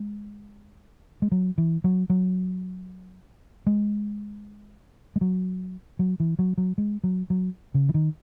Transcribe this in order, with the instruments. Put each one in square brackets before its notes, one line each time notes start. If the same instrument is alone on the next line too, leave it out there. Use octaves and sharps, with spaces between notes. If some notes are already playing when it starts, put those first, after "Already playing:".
Already playing: [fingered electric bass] G#3
G#3
F#3
E3
F#3
F#3
G#3
G#3
F#3
F#3
E3
F#3
F#3
G#3
F#3
F#3
C#3
E3
D#3